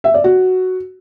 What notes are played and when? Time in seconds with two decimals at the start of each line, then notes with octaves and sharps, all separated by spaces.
0.04 E5
0.14 D5
0.24 F#4